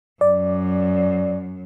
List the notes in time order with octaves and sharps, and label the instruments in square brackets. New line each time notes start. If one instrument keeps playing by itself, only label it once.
[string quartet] F#2 [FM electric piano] D5